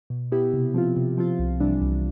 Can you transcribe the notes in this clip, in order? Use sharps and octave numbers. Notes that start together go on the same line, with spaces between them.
B2
B3 E4 G4
C3
F3 C4 F4
C3
F3 C4 F4
C2
C3 E3 G3 D4
C2